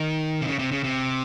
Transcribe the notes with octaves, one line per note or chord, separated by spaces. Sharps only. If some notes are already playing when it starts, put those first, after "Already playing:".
Already playing: D#3
C3
C#3
C3
C#3
C3